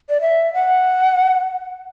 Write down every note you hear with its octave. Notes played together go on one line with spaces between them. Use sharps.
D5
E5
F#5